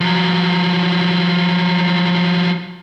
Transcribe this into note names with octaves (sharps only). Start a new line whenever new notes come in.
F3 F#3